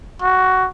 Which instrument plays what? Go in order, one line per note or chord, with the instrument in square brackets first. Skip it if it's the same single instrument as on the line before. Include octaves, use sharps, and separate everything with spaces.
[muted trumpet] F#4